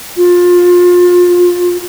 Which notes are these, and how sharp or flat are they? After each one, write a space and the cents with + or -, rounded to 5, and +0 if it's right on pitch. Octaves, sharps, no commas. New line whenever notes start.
F4 +25